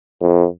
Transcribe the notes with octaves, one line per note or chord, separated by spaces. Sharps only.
F2